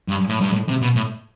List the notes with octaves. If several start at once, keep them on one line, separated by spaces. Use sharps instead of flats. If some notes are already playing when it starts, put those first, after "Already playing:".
G2
A2
G2
A2
C3
B2
A2